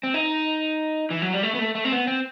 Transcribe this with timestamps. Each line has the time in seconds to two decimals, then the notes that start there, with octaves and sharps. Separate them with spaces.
0.03 C4
0.14 D#4
1.10 E3
1.22 F#3
1.33 G3
1.43 A3
1.55 B3
1.59 A3
1.75 A3
1.85 C4
1.92 B3
2.07 C4